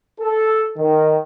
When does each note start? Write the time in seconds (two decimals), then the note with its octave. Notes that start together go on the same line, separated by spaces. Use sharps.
0.19 A4
0.77 D#3